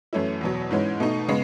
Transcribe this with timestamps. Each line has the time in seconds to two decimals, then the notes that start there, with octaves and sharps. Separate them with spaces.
0.13 F#2 E3 A3 C#4 E4
0.41 E2 B2 F#3
0.71 G#2 E3 G#3 C#4
1.00 B2 A3 D#4
1.28 C#3 G#3 B3